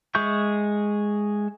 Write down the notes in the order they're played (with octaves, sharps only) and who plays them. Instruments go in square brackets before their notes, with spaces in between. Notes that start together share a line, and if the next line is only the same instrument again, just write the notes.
[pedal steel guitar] G#3 G#4 E5 C#6 G6